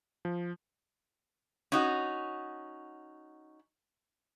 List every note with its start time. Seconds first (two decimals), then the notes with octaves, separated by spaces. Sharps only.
0.25 F3
1.72 C#4 D#4 F#4